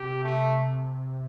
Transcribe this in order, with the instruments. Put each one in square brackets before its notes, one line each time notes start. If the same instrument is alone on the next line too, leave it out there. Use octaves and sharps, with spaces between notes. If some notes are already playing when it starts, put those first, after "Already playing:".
Already playing: [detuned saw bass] C3 [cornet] G4
[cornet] A3